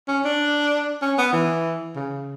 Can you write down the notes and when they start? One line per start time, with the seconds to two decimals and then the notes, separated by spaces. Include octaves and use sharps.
0.08 C#4
0.25 D4
1.02 C#4
1.18 B3
1.33 E3
1.96 C#3